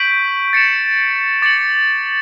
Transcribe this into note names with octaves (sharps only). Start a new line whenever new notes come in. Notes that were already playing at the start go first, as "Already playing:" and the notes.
Already playing: C#6 G6 B6 D7 F#7
A6 C#7 E7
D6 A6 C#7 F#7